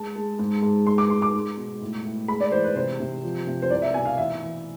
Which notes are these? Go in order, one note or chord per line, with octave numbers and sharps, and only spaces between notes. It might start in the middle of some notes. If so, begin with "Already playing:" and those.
Already playing: G#3 A5
G#3
G#2
G#2
G#3 C6
D6
G#3 C6
D6
G#3
B2
A2
A2
G#3 B5
D5
E3 C5
B4
C3 C5
C3
F3
C3
C5
C2 D5
E5
B2 G#5
F5
E3 E5
E3